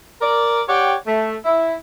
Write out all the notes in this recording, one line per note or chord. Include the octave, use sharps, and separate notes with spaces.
A#4 D5
G4 C#5 D5 F#5 G5
A3
E4